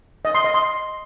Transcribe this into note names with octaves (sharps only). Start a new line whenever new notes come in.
D#5
C6
D#5
C6